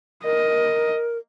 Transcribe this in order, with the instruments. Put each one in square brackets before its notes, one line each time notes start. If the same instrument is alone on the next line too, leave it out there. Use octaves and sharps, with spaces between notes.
[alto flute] A#4 [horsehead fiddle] D#5